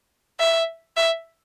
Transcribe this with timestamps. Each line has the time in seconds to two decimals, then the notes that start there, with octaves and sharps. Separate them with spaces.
0.40 E5
0.97 E5